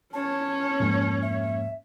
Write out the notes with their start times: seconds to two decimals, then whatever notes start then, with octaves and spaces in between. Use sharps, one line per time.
0.13 C#4 C#5 A5
0.80 F2 G#2 A#3
1.22 E5